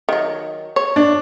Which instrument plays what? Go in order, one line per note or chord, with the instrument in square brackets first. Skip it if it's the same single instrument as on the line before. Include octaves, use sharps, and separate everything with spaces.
[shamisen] D#3 F#3
C#5
[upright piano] D4